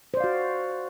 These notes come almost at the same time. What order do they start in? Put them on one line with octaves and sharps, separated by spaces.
C5 D5 F5 F#4